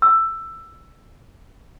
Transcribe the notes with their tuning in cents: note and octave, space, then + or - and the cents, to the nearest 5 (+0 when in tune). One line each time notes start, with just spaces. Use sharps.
E6 +10